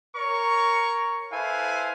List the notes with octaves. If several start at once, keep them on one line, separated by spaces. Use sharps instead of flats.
A#4 C#5 C#6
E4 A4 B4 C5 F5 G#5